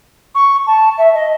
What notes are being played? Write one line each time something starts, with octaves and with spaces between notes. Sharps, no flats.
C#6
A5
E5
D#5